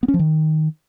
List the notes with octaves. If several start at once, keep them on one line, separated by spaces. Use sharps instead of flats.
B3
C#4
F3
D#3